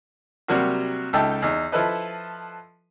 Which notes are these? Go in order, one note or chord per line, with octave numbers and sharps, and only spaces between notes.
C3 F#3 G3 A#3 F#4
C#2 D#4 A4 E5 G5 A5
E2 D#4
F3 E4 A4 B4 D#5